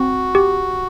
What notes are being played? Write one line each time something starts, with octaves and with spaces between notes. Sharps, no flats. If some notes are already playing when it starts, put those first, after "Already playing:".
Already playing: C4 F#4
G4